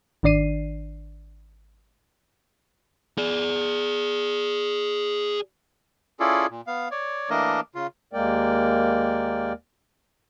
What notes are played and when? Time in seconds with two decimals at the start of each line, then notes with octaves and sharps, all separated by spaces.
0.23 G#1 D#3 D4 D5 C7 D#7
3.18 G#4 D5
6.20 C#4 E4 F4 G#4 A4 D5
6.50 A#2
6.67 B3 F5
6.91 C#5 D5
7.30 E3 A3 A#3 D4 A#4 D#5
7.75 C#3 F4
8.13 D#2 G#3 A#3 A#4 D5 G5